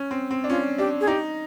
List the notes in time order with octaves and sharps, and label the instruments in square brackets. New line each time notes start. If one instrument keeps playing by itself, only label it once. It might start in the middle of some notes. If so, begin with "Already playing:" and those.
Already playing: [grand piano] C#4
C4
C4
D4
[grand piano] C#4 [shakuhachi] F4
[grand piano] D4 [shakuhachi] G4
[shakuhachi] G#4
[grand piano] D#4 [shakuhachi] G4